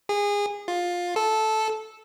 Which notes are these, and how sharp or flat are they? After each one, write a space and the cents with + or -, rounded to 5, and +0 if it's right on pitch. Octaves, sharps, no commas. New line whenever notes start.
G#4 -25
F4 +15
A4 -10